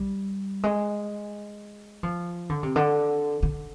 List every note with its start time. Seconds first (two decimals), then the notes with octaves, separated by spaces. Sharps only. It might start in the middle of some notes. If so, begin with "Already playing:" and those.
Already playing: G3
0.63 G#3
2.03 F3
2.49 D3
2.63 C3
2.76 D3
3.42 D3